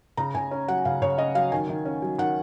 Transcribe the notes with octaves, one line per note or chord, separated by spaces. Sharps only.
C#3 A#5
C#3 G#5
C#4
F#3 F#5
C#3 F5
C#3 C#5
C#4 D#5
F#3 F5
D#3 G#5
D#3
C#4
F#3
D#3 F#5